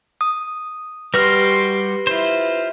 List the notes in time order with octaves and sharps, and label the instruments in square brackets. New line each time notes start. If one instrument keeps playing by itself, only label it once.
[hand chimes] D#6
[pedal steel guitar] G3 F#4 F6 [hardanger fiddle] G4 C6 [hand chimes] B4 A#6
[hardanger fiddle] E4 [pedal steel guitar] F4 C5